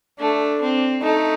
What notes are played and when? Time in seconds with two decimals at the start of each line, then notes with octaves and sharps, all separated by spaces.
0.19 A3 D4
0.61 C4
1.03 A3 D#4